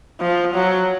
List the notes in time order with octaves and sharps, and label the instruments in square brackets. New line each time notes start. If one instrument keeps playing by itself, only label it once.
[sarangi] F3
F#3